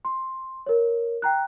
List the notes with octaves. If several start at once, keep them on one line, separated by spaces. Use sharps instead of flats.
C6
A#4 C#5
G5 A#5 F#6